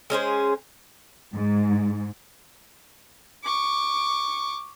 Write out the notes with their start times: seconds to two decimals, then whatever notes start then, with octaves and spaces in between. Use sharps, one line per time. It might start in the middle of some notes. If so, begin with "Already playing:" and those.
0.10 G#3 C#4 G#4 C5
1.34 G#2
3.44 C#6 D6